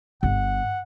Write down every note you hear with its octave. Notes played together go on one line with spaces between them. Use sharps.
G1 F#5